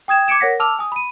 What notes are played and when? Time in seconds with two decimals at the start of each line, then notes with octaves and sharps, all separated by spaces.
0.08 G5 D#6 G#6 E7
0.28 D6 G#6 C#7 D7 E7
0.40 A#4 C#5 F#5 A#6 B6
0.60 A5 D6 E6 F6 F7
0.79 G#5 D#6
0.92 B5 D#7